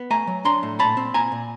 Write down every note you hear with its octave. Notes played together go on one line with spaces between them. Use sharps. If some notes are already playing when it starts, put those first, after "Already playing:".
Already playing: B3
A3 G#5 A#5
F#3
D4 A#5 C6
A2
A#2 A5 B5
C4
A#2 G#5 A#5
A#2